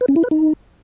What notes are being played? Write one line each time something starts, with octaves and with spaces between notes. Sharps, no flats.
B4
C#4
E4
B4
D#4